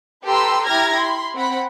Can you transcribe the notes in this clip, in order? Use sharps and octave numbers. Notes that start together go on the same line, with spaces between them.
G4 A4 B4 A#5 C6 E6
E4 G4 A#5 F6 G#6 A#6
B5 C6
C4 F#5 B5